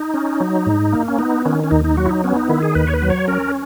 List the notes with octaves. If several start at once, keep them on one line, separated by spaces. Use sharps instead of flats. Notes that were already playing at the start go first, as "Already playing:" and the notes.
Already playing: D#4
C#4
F#3
G#2
A#3
C#4
B3 D#4
D#3 C#4
C#4
D#2 D#4
D#4
F#3 F#4
E4
D#4
B3 C#4
D#4
D#3 E4
G#4
D#2 B4
C#5
B4
F#3
C#5
C#4 A#4